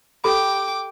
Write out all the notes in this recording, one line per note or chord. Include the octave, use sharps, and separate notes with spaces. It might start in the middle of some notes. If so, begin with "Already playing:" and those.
G4 A4 G5 B5 D6